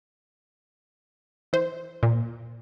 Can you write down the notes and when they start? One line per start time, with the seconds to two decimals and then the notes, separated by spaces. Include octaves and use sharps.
1.53 E3 C5
2.03 A#2